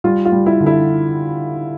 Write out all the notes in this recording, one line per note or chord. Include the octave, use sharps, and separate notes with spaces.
G3 F4
F4
G3
E4
D3
E4